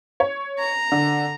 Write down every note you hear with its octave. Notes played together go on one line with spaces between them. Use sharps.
C#5
A#5
D3